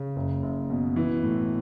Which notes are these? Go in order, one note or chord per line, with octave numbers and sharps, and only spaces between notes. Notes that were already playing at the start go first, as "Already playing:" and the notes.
Already playing: C#3
F#1
F#1
B2
E3
A2